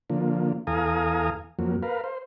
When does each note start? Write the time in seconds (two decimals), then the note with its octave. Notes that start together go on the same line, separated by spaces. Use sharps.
0.10 D3 F3 A#3
0.67 E2 A4 F5 G#5 A#5 D#6
1.59 F2 F#3 A#3
1.83 A#4 B4 F5
2.04 C5